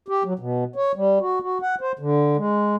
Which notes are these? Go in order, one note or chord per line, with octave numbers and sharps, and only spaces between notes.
G4
F#3
B2
C#5
G3
F#4
F#4
F#5
C5
D3
G#3